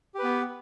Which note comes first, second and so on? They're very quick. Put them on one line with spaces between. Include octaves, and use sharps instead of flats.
G4 B4 B3